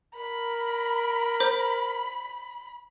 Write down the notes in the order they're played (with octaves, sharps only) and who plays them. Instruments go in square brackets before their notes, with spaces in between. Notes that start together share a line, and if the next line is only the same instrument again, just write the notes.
[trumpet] A#4 [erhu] B5
[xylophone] C5